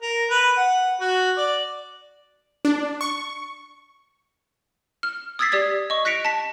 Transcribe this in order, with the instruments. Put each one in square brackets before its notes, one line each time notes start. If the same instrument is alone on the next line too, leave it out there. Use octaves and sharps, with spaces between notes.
[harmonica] A#4
B4
F#5
F#4
D5
[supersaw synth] D4
C#6
[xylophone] F6
D#6 E6 G#6 A6 B6 C7
G4 D5 D#6 G#6 B6
D#5 C#6
F#6 A#6 B6 C#7 D7 F7
A5 B6